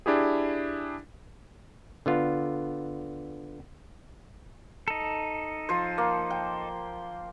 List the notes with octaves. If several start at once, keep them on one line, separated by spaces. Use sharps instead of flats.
D4 E4 G4 G#4
D3 B3 F4
D#4 A4
F3 C5
A#3
G5